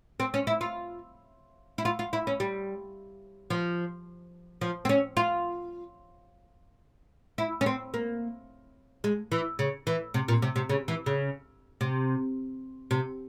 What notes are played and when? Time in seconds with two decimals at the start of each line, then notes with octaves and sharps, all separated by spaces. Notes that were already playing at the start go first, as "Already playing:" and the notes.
0.20 C4
0.34 C#4
0.47 E4
0.61 F4
1.78 E4
1.85 F4
1.99 F4
2.13 E4
2.27 C#4
2.40 G3
3.50 F3
4.61 F3
4.85 C4
4.89 C#4
5.17 F4
7.38 E4
7.61 C#4
7.66 C4
7.94 A#3
9.04 G#3
9.32 E3
9.59 C#3
9.87 E3
10.14 C3
10.28 A#2
10.42 C3
10.56 C3
10.69 C#3
10.88 E3
11.06 C#3
11.81 C3
12.91 C3